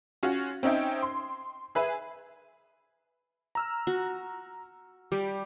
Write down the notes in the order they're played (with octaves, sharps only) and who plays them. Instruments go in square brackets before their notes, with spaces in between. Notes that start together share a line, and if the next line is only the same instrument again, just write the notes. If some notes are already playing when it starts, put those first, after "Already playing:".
[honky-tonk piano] C#4 F4 F#4
C4 C#4 D#4 E5 G5
C6
G#4 B4 E5
[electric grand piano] A#5 E6 F6
[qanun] F#4
[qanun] G3 [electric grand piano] G4